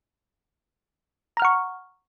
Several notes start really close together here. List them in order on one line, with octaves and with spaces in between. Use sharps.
A#5 F6 F#5 C#6